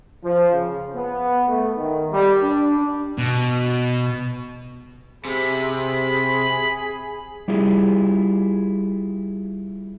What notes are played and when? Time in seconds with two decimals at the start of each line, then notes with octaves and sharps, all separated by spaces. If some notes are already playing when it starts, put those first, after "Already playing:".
0.24 F3
0.53 C#3
0.95 B3
1.48 A3
1.78 D#3
2.11 G3
2.41 D4
3.18 B2
5.25 C3 G#4 B5
7.48 G3 E4 F4 G4 G#4